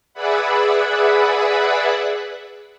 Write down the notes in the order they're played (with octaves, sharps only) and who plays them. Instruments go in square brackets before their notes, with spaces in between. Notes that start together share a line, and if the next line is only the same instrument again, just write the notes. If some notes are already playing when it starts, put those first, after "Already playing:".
[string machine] G#4 B4 D5 E5 F#5 B5